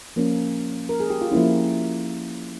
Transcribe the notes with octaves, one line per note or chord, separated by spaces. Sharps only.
F3 A#3 C#4
A#4
G#4
G4
F4
F3 A#3 C#4 E4